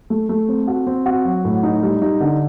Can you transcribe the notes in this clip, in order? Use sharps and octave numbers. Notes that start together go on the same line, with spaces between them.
A3
A3
C4
F#4
C4
F#4
F#3
A2
D#4
G3
D#4
D3